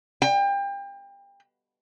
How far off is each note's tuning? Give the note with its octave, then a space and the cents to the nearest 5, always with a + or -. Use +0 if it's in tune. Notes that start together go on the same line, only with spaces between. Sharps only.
G5 +30